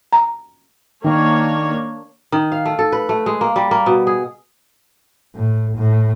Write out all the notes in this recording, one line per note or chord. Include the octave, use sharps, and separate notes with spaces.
A#5
D#3 A#3 D4 C#5
D#3
F5
A3
A4
B4
A3
G#3
A#3
G3
A#3
B2
G#4
A2
A2